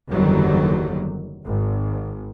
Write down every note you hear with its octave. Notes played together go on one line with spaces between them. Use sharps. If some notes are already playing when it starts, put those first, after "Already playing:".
F#1 E2 D3 D#3 F#3 G3
G#1